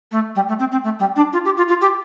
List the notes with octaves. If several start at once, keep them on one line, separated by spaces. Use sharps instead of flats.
A3
G3
A3
C4
C4
A3
G3
D4
F4
G4
F4
F4
G4